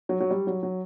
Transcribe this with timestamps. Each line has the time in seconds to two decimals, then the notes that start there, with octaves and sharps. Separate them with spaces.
0.09 F#3
0.20 F#3
0.30 G3
0.47 F#3
0.63 F#3